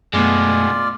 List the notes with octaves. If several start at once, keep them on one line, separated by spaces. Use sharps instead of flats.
F#2 B2 G#3 A3 B3 F4 D5 G#5